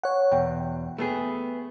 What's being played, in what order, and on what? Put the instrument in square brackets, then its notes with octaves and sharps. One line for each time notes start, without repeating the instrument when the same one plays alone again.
[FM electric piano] C#5 F#5
[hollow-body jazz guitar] E2 B2 [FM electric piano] G5
[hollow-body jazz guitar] A3 B3 G#4